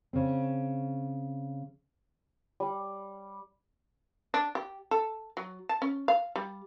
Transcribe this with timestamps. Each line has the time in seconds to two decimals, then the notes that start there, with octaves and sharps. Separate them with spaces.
0.13 C#3 C4
2.60 G3
4.34 D4
4.55 G4
4.91 A4
5.37 F#3
5.69 A5
5.82 C#4
6.08 F5
6.36 G3